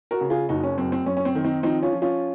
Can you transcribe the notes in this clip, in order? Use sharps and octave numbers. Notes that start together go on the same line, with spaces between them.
F#4 A#4
C#3
F4 G#4
F#1 D#4 F#4
C#4
F#2 C4
C4
F#2 C#4
C#4
C4
D#3
C4 D#4
F3 C4 D#4
C#4 F4
F3
C#4 F4